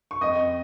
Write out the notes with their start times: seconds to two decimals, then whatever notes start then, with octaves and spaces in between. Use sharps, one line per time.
0.11 C#6
0.21 F2 D#5 D#6